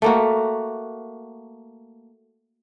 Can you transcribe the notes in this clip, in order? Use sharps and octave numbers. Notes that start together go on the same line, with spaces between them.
A3 A#3 F#4